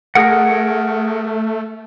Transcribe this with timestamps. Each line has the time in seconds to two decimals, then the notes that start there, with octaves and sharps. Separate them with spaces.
0.15 A3 G#4 A#4 F#5